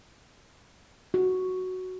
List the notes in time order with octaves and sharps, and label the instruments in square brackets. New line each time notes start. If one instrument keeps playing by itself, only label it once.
[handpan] F#4